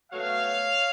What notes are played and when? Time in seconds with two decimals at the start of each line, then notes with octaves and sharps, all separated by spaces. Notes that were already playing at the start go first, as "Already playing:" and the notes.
0.11 B2 F#3 A3 C#5 F5